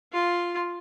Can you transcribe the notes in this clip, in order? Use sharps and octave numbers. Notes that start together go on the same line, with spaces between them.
F4